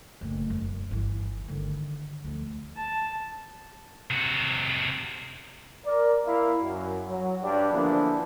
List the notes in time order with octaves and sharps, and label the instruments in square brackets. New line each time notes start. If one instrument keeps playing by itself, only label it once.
[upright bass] F#1 A2
E1 F#2
G1 E3
D3 D#3
D2 F3
[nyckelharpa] A5
[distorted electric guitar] C3 F#4
[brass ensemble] A#4 D5
A#3 E4 F5
F#2
F#3
G2 D4 G4
D3 E3 F3 A#3 B3 D4